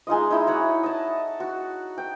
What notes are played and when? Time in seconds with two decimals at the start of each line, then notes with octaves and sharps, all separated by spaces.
0.07 G#3 D#4 F4 D#5
0.31 D#4 E4 D#5
0.47 F#4 C#5 F#5
0.83 D#5 A5
1.40 F#4
1.98 G5